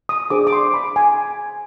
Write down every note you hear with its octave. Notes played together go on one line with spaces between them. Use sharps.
D#6
D4 G#4 C5 D6
D6
C6
B5
G#5